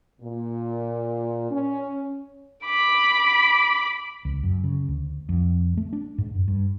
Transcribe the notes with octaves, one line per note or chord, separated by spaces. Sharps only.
A#2
C#4
B5 D6
C#2
F#2
C#3
D2
F2
A3
D4
G#2
F#2
G2